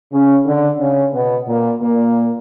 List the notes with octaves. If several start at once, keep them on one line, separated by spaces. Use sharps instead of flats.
C#3 C#4
D3 D4
C#3 C#4
B2 B3
A#2 A#3
A#2 A#3